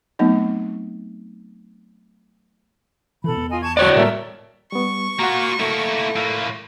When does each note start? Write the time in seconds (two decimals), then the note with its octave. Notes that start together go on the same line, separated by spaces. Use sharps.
0.19 F#3 A3 B3 C4 D#4
3.24 B2 E3 A4 B5
3.36 E2 B3
3.50 F4 D#5 G#5
3.61 A5 C#6 G#6
3.77 F#4 C#5 D5 F#6
3.96 A2 G3 A#3 A4 A#4 E5
4.72 G3 B3 C#6
5.19 A#3 F4 F#4 F#5 A#5
5.60 A3 A#3 E4
6.16 A2 A#3 E5 F5